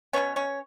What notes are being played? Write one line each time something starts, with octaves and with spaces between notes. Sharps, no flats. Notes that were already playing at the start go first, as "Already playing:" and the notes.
B2 G3 B3 C#4 C#5
C#4 C#5